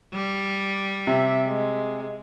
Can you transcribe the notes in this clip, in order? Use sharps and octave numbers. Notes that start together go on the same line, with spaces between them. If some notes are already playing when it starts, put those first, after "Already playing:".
G3
C3 E5
G#3